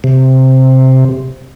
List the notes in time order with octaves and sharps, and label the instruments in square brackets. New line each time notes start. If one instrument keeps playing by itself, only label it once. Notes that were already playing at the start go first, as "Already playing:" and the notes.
[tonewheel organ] C3